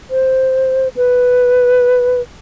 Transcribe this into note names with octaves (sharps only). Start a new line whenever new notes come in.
C5
B4